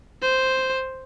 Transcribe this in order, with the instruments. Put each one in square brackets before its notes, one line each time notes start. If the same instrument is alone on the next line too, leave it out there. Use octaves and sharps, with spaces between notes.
[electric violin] C5